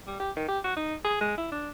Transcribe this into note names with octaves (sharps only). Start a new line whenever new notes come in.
G3
G4
D#3
G4
F#4
D#4
G#4
G#3
E4
D4